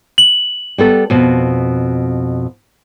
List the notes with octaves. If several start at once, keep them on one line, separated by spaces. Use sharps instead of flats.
F#7
G3 B3 A4
F2 B2